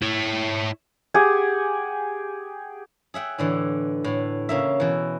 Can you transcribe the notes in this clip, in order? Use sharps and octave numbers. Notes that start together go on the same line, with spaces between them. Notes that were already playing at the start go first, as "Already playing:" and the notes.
E4 C#5
G4 G#4 F#5 G#5
G#4 E5 F#5 G5
A2 D3 E3
A2 F#5
C#3 A#3 E5
B2 E3